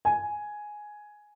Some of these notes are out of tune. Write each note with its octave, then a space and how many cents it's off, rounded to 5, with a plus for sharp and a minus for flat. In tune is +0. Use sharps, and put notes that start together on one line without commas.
G#5 +5